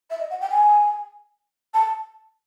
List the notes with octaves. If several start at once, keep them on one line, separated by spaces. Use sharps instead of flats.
E5
D#5
F#5
G5
G#5
A5